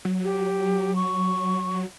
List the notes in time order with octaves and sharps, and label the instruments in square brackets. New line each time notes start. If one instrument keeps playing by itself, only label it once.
[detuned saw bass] F#3
[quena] G4
C#6